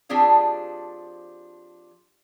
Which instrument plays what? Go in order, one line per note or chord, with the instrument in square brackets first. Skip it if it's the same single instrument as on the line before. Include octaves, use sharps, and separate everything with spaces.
[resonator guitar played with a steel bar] F3 C4 D4 G4 G#4 F5